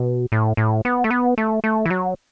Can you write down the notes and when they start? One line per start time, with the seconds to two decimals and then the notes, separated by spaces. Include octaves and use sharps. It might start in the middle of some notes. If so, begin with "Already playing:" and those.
Already playing: B2
0.32 A2
0.57 A2
0.85 B3
1.04 A3
1.11 B3
1.38 A3
1.64 A3
1.86 E3
1.90 F#3